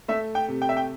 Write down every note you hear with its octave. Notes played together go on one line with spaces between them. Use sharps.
A3 E5
G5
C3
G5
E5
G5